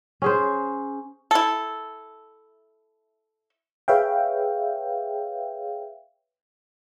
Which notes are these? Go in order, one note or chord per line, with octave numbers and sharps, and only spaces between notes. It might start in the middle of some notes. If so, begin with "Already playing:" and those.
C#4 G#4 C5
E4 A4
G#4 B4 C#5 E5 F5 G5